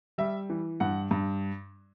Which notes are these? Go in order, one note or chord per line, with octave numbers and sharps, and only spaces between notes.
G3 E5
E3
G2 F#5
G2